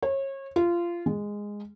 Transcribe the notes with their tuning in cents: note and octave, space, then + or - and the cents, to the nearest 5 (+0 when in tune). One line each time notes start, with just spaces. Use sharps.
C#5 -30
F4 -20
G#3 -10